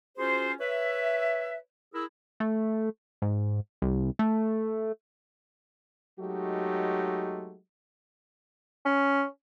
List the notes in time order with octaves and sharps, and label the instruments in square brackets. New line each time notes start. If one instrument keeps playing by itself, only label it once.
[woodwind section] C#4 F4 F#4 G#4 C5
B4 C#5 E5
E4 G#4 A#4 E6
[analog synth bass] A3
G#2
C2
A3
[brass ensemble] F#3 G#3 A3 D#4 F#4 G4
[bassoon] C#4